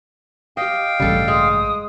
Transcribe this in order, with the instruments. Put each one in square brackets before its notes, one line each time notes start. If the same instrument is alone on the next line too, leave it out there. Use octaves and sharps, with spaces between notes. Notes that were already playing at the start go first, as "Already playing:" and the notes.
[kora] G4 D#5 [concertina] F5 G5
[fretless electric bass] A1 G2 C#3 [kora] G3 A4
[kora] G#3 [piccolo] D#6